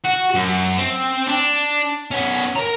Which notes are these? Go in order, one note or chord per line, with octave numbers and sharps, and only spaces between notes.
F#4
F#2
C4
D4
B3 C#4
A#4 A#5